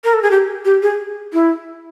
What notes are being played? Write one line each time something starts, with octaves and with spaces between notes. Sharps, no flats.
A#4
A4
G#4
G4
G4
G#4
E4